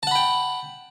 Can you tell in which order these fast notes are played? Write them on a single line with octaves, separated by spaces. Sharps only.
A5 F#5 B5 G5